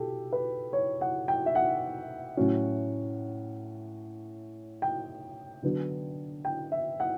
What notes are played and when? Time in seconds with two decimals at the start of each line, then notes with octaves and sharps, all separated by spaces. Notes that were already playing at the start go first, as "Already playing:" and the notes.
Already playing: B2 G4 A4
0.33 B4
0.73 C#5
1.01 F#5
1.28 G5
1.46 E5
1.55 F#5
2.37 A2 F#3 C#4
4.82 G5
5.63 D3 F#3 B3 D4
6.45 G5
6.72 E5
7.00 F#5